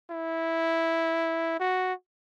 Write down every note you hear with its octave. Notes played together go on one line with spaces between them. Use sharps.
E4
F#4